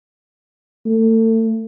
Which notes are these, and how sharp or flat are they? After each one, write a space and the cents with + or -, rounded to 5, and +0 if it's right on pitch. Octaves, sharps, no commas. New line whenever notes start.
A3 +30